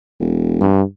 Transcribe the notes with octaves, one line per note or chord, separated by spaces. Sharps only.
E1
G2